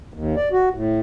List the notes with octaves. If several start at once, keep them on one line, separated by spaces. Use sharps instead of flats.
D#2
D5
F#4
A2